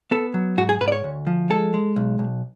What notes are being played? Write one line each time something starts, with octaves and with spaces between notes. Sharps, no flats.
B3 A4
F#3
G#2 F#4
G#4
G#2 B4
D5
C#5
D2
F3
G#3 A4
G#3
B1
B1